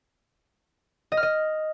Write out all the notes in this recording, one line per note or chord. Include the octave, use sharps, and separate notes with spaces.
D#5
F6
D#5